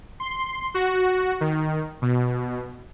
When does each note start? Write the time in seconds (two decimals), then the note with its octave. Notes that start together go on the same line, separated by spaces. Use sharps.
0.20 C6
0.74 F#4
1.41 D#3
2.02 B2